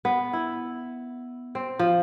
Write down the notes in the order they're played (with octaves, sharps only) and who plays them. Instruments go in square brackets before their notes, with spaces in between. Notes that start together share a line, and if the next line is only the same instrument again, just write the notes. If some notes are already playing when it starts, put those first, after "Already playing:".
[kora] B3
E4
C4
F3